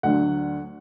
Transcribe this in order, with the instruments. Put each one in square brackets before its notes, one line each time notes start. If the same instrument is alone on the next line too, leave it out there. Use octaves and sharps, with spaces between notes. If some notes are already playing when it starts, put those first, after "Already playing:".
[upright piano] D2 D3 F#3 F#5